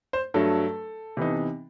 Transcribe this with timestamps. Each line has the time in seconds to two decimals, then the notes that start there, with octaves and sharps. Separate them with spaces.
0.13 C5
0.34 G2 F#3 A3 A4
1.17 C3 E3 B3 D#4